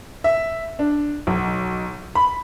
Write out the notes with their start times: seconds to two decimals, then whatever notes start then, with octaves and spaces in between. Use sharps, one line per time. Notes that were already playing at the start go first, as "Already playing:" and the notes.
0.24 E5
0.79 D4
1.27 B1
2.15 B5